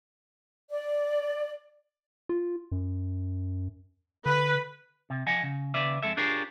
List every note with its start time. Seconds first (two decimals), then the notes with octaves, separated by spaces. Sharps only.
0.70 D5
2.29 F4
2.72 F#2
4.26 D3 B4
5.10 C3
5.27 F3 D#5 F#5 G#5
5.43 C#3
5.74 D#2 C#3 B4 D5 E5
6.03 F2 G#3 A4 E5
6.17 D4 F4 G4 G#4 A#4 C#5